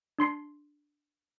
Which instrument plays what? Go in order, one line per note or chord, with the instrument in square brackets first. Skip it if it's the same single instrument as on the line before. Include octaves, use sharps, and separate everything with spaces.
[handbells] D4 C6 C7